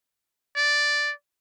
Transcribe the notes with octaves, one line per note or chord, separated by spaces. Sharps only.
D5